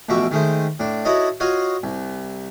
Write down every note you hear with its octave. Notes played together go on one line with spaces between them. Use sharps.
A1 B2 F3 F#4 E5 D6
D#3 G#3 A3 C5
A2 D4
D#4 E4 F#4 A4 C#5 D#5
F4 F#4 C#5 D#5 F5
C2